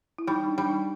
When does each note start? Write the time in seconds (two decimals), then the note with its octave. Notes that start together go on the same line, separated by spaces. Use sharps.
0.19 E4
0.27 G3 D#4
0.44 D#4
0.47 D4
0.58 G3
0.69 D#4